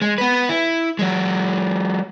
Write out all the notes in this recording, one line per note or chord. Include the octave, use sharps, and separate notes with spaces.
G#3
B3 B4
E4
F#3 G#3